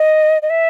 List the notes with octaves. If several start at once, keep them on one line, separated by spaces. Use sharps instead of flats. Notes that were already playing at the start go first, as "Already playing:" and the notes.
Already playing: D#5
D#5
E5